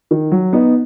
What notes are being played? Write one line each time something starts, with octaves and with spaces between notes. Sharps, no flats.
D#3
F#3
B3 D#4